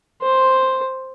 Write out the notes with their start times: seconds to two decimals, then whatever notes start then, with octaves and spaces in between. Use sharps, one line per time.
0.22 C5